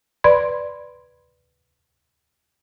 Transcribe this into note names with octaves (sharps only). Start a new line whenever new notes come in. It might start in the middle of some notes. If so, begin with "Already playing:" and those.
B4 D5 B5 C6 G#6